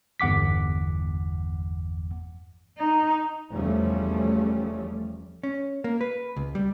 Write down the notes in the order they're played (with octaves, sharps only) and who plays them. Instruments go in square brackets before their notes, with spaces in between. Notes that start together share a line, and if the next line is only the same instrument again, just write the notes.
[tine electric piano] G1 E2 F#5 D6 B6
[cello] D#4
[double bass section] F1 E2 F3 G3 A3 C#4
[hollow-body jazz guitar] C#4
A#3
B4
C#2
G3